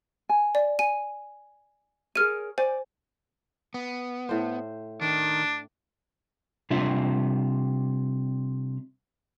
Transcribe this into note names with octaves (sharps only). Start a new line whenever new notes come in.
G#5
D5
G#5 D#7
G#4 A#4 C#5 F6 D#7
C5 D5 G#5
B3
A2 C5
D#3 D4
C3 G3 D4 F4 E5